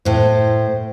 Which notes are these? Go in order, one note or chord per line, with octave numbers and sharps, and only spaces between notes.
A2 C5